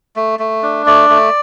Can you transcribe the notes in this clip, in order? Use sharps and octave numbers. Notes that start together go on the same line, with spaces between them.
A3
A3
D4
A3 D5
A3